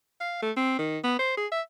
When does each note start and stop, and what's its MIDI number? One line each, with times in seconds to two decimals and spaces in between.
0.21 0.38 77
0.42 0.51 57
0.56 0.78 60
0.79 0.98 51
1.04 1.16 59
1.19 1.37 72
1.37 1.47 68
1.52 1.62 76